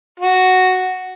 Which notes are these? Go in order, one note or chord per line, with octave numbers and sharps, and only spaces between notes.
F#4